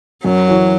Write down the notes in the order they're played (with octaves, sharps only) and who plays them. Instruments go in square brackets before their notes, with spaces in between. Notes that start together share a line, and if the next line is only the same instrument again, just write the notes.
[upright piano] F#2 [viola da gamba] F#3
[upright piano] E3 C#4 F#4